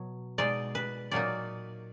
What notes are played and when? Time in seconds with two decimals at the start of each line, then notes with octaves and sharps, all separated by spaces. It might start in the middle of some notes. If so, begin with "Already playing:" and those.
Already playing: B2 F#3
0.38 B2 G#3 D#4 D5
0.75 B4
1.11 A#2 F#3 A#3 D#4 D5